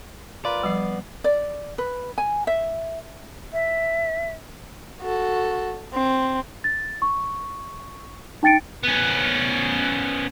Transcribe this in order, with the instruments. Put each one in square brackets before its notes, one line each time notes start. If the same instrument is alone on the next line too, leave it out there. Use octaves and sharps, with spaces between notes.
[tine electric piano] F4 A#4 B4 [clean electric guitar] D5
[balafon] F3 G3 [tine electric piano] B3 C7
[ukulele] D5
B4
G#5
E5
[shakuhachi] E5
[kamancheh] F#4 A4
C4
[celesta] A6
C#6
D#4 G5 A6 C#7 D7
[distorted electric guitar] B3 C#4